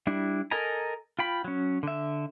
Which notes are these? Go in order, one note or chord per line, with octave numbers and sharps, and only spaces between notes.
G3 D4 E4
A4 A#4 D#5 G#5 A#5
F4 G5 B5
F#3 C#4
D3 E5